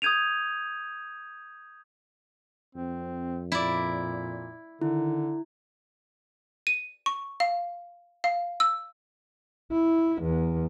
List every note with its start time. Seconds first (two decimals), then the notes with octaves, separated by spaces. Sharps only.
0.02 D#6 G6 G#6 D#7 F7
2.75 F2 C4
3.52 A#2 E4 D5
4.82 D3 D#3 E4
6.67 D#7
7.06 C#6
7.40 F5
8.24 F5
8.60 E6
9.72 E4
10.22 E2